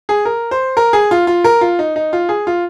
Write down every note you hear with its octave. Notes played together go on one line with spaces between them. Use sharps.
G#4
A#4
C5
A#4
G#4
F4
F4
A#4
F4
D#4
D#4
F4
G#4
F4